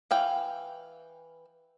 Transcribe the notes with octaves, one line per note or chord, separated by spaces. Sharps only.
E3 F5 G5